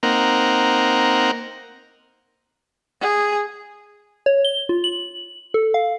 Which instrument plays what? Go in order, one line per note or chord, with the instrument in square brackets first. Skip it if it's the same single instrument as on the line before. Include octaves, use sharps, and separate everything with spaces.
[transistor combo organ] A#3 C4 D#4 A#4 F#5
[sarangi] G#4
[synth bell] C#5
G7
F4
F#7
A4
F5